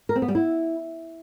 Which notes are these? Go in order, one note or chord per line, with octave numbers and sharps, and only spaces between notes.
A#4
C4
B3
G3
E4